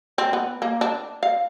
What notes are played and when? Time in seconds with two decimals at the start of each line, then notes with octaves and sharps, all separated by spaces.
0.18 C4
0.33 B3
0.62 A#3
0.81 D4
1.23 F5